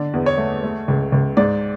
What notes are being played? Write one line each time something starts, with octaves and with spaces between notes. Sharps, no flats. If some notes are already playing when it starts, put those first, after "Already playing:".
Already playing: D3 D5
E2
C#5
A3
A3
C#2
C#2
G#2 D5